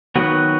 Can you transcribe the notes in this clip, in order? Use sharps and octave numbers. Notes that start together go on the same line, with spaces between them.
D#3 F#3 B3 F#4 B4